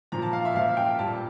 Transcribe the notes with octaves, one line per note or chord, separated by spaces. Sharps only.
A#2 F3 A#5
A5
F5
E5
A#2 F3 F5
G5
A#2 G3 A5